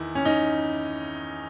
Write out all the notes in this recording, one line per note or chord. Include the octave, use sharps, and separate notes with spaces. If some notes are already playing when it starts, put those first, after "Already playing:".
Already playing: E2 D#3 E4
C#4
D#4